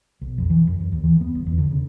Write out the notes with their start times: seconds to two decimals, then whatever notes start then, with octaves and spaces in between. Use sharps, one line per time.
0.21 B1
0.38 F2
0.50 E3
0.67 F#2
0.80 F#2
0.92 D#2
1.04 E3
1.21 B3
1.35 G1
1.47 E2
1.58 D3
1.71 C#3